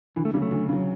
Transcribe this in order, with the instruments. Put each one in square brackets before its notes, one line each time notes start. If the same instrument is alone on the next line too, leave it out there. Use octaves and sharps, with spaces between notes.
[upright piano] D2 [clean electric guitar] E3
[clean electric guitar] A3
[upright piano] C#3 [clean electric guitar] G3
[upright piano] F#3
[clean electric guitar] A3
[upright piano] D2
C#3 F#3